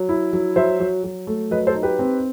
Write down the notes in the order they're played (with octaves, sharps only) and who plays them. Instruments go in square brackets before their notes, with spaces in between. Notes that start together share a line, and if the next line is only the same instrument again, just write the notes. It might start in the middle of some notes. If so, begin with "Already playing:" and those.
Already playing: [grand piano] F#3
E4
F#3
F#3 C5 E5
F#3
F#3
A3
F#3 B4 D#5
A4 C5
D#4
G4 B4
C4